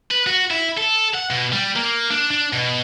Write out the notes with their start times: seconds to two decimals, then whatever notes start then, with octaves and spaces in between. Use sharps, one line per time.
0.11 B4
0.27 F#4
0.51 E4
0.78 A4
1.15 F#5
1.30 B2
1.52 G3
1.76 A#3
2.10 D4
2.30 D4
2.53 B2